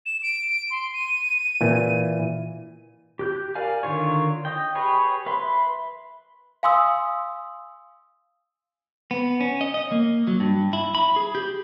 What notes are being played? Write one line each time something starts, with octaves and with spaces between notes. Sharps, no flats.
E7
D7
C6
D#7
A#2 E3
G4 F#6 G6
A#4 D5 F5 G#5
D3 D#3 F4 C#5
D#5 G5
G4 G#4 B4 C#5 G#5
B4 E5 B5 C6
F5 G#5 C6 D#6 E6
B3
C#4
D#5
D#5
A#3
F#3
G2
E4
B5
G#4
G4